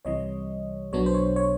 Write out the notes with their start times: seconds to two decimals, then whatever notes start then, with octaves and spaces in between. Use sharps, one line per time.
0.05 C2 C3 E3 G3 C#5 D#5
0.93 B1 B2 F#3 B3 D4 C#5
1.06 C5
1.14 C#5
1.36 C#5